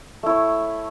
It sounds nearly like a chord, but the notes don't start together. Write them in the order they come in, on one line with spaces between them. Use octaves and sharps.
A3 E4 C#5